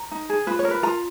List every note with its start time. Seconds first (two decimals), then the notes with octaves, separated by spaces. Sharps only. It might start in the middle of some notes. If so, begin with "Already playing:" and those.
Already playing: A#5
0.11 D#4
0.30 G#4
0.47 F4 B4
0.59 C#5
0.65 A#4
0.71 B4
0.83 F4 A#5